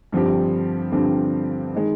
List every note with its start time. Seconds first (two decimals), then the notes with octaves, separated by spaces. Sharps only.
0.12 G2 D3 F3 C4 G4
0.92 G2 D3 F3 C4 G4
1.74 D#3 G#3